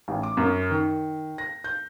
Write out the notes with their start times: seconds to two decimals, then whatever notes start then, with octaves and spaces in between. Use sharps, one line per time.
0.08 A1
0.23 D6
0.37 F#2
0.70 D#3
1.38 A#6
1.64 G6